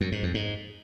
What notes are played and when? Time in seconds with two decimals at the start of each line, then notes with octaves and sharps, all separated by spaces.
0.01 F#2
0.12 G#2
0.23 F2
0.34 G#2